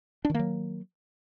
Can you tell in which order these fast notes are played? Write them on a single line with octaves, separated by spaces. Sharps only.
D4 D#3 A#3 F#3